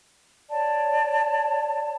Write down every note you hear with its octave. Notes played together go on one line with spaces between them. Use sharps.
C#5 D5 A5